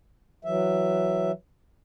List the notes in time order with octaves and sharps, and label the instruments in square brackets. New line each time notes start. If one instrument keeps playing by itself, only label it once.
[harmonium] E3 F#3 E5